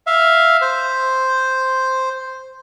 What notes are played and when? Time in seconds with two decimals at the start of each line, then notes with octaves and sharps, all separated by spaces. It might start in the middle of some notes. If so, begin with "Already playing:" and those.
0.07 E5 F5
0.61 C5